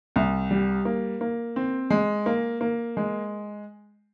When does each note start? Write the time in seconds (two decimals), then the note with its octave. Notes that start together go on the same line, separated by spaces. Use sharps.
0.16 C2
0.51 G3
0.85 A#3
1.21 A#3
1.56 C4
1.90 G#3
2.26 A#3
2.61 A#3
2.97 G#3